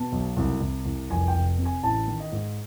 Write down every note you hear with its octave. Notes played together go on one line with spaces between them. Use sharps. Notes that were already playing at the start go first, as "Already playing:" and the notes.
Already playing: B2 A5
B1
C2
C2
C2
F1 G#5
G5
F1
C3
G#5
A1 A5
D#3
D#5
G#2